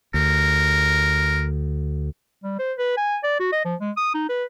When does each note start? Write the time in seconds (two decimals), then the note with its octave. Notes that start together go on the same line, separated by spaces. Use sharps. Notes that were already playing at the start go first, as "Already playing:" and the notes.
0.14 D2 A#4
2.44 G3
2.59 C5
2.78 B4
2.97 G#5
3.24 D5
3.40 F#4
3.52 D#5
3.65 F3
3.81 G#3
3.97 D#6
4.14 D#4
4.29 B4